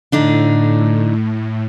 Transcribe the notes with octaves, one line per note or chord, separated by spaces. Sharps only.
A2 D3 D4 D#4